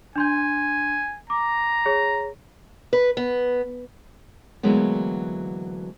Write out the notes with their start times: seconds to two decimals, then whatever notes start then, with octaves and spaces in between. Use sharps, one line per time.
0.16 D4 G#5 C6 G6
1.30 A#5 D6
1.86 G#4 C#5
2.93 B4
3.17 B3
4.63 D2 E3 F#3 G#3 A#3 B3